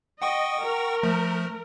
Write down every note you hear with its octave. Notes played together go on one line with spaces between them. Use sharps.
D#5 F#5 G5 C#6
A#4
F3 A3